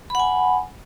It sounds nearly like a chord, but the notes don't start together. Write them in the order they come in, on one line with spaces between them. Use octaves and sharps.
B5 F#5 G#5